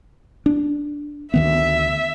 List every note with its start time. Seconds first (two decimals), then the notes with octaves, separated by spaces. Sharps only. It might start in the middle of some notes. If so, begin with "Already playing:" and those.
0.46 D4
1.34 D2 D#3 B3 E5